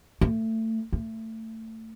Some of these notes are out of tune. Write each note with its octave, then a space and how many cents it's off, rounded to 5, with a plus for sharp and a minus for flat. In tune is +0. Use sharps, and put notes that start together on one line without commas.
A3 +25
A3 +25